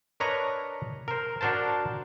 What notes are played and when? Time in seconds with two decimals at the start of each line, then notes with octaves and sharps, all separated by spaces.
0.20 D4 A#4 B4 C#5 D#5 A#5
1.08 A#4 C5
1.41 D4 F#4 A#4 C5 A5